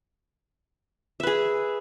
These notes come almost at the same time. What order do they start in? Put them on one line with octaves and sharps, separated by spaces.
E5 B4 G#4